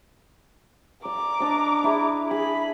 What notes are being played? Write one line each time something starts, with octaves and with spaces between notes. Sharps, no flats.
D5 A#5 D6
D4 D#5
E4 G#4 E5
G#4 B5